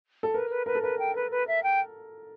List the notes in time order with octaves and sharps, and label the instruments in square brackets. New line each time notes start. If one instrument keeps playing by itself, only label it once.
[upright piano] A4
[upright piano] A#4 [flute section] B4
[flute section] B4
[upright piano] A#4 [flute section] B4
[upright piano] A4
[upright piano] A#4 [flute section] B4
[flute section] G5
B4
B4
E5
G5